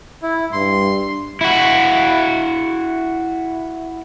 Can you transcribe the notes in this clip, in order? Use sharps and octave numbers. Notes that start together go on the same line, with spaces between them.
E4
G2 C6
E4 F#4